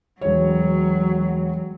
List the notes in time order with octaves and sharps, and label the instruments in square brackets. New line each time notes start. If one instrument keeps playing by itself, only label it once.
[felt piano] E1 C#5 [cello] F#3